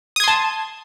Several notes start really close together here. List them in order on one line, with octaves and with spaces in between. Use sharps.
D#6 G#6 C6 A5